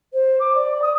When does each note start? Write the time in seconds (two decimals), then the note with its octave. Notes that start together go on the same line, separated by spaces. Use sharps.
0.13 C5
0.39 D6
0.54 D5
0.82 D#6